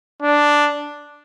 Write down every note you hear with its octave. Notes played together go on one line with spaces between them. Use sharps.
D4